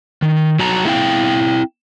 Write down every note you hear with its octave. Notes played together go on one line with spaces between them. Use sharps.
D#3
F#3 A5 A#5
A3 C4 E4 F5 G5